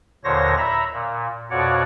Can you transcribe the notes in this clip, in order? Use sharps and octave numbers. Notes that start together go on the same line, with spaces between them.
D#2 A#2 D3 C5 C#5 A#6
E5 A#5 B5
A#2
F2 B2 F#4 C#5 D5 F#5